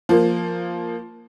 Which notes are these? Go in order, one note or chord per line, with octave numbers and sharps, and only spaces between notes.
F3 A#3